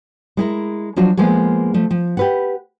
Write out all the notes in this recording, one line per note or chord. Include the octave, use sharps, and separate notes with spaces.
G#3 E4 A#4
F3 F#3 D4 F4 F#4
F3 G#3 A#3 B3 G#4
F3 A3
F3
G4 B4 F#5